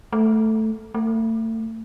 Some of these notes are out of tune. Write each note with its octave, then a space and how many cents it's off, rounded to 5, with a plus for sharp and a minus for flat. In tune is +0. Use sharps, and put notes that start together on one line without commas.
A3 +0
A3 +35